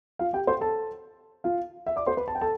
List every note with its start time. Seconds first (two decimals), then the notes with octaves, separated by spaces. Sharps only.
0.19 F4 F5
0.33 G4 G5
0.47 C5 C6
0.61 A4 A5
1.44 F4 F5
1.87 E5
1.96 D5 D6
2.07 C5 C6
2.17 B4 B5
2.28 A5
2.35 G5
2.41 A4 A5